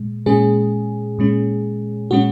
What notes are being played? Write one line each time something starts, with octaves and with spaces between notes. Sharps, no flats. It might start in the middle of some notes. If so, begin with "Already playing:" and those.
Already playing: A#2 G#3
A#2 G#3 C#4 G#4
A#2 G#3 C#4
A#2 G#3 C#4 F#4